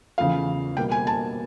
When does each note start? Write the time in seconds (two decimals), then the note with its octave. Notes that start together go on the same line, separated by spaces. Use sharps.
0.18 E2 C#3 F3 A3 F5
0.77 B2 G3 A#3 G5
0.91 G#5
1.07 A5